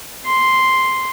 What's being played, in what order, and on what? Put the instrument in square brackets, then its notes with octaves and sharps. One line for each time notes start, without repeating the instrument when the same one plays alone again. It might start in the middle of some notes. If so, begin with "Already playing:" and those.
[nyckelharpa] C6